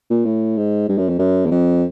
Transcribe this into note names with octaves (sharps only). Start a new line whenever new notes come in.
A#2
A2
G#2
G2
F#2
F2
F#2
E2
F2